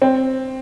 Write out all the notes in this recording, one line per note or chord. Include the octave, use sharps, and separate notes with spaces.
C4